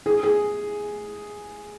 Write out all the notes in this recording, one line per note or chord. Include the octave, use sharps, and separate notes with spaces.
G#4
G#4